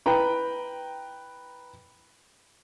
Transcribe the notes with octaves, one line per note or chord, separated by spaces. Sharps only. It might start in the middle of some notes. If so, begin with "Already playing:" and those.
E4 B4 G5 A#5